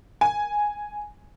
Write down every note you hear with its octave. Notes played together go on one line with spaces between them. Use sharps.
G#5